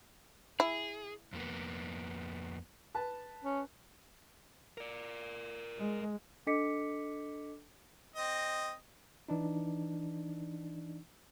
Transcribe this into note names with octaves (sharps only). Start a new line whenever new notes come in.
E4 G#4
F2 A#3 B3
B4 A5
C#4
A#4 D5
G#3
D4 A4 D#5 D6 B6 C#7
C4 D#5
E3 D4 D#4